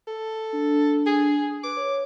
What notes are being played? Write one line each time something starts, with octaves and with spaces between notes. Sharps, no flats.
A4
D4
G#4
B4 D6
C#5